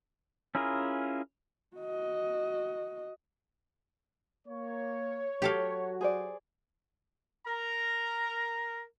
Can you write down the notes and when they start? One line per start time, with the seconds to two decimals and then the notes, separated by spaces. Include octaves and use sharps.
0.55 C#4 E4 F4 G#4 A#4
1.77 F#4 D#5
4.48 A#3 C#5
5.42 F#3 F#4 G4 A4 F5
6.01 G#4 C5 D5
7.46 A#4 A#5